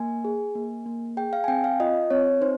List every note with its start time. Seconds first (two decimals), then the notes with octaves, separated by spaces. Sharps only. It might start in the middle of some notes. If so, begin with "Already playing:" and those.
Already playing: A#3 G#5
0.25 G#4
0.55 A#3
0.86 A#3
1.17 G#4 G5
1.33 F5
1.44 G#5
1.48 C4 G5
1.64 F5
1.80 F4 D#5
2.10 C4 C#5
2.41 D#4 C5